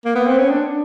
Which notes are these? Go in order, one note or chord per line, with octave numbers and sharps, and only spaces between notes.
A#3
B3
C4
C#4
D4